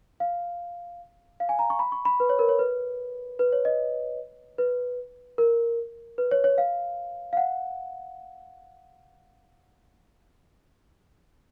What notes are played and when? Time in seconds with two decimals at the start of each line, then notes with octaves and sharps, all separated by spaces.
0.20 F5
1.40 F5
1.49 G#5
1.59 A#5
1.70 C#6
1.79 B5
1.92 C#6
2.05 B5
2.20 B4
2.29 C#5
2.39 A#4
2.49 C#5
2.59 B4
3.39 B4
3.52 C#5
3.65 D#5
4.58 B4
5.38 A#4
6.18 B4
6.31 C#5
6.44 C#5
6.58 F5
7.33 F5
7.37 F#5